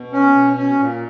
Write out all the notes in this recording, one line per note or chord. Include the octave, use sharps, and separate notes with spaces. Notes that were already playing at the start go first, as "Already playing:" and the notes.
Already playing: B2
C#4
B2
C#4
A#2